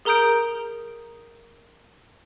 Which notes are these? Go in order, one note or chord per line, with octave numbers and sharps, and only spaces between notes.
G#4 A#4 A#5 D#6 G6 D7